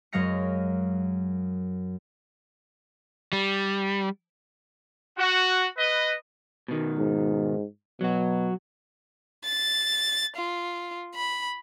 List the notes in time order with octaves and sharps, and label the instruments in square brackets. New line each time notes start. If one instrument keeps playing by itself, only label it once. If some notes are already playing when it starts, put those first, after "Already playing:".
[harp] F#2 F#3 G#3 F5 A#6 C#7
[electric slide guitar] G3
[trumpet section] F#4
B4 D#5
[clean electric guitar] B2 D#3
[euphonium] G#2
[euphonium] B2 [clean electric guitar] F#3 F#4
[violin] A6
F4
B5